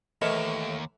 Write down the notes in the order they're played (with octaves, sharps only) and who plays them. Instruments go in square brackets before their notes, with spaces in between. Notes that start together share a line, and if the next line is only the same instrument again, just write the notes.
[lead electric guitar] D#2 [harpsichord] A2 E3 [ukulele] A#4 C#5 D#5